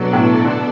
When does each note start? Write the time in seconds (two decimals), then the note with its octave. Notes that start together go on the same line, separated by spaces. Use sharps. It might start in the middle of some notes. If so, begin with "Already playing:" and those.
Already playing: B2 F#3 B3 D4 A4 D5
0.13 A2
0.45 D3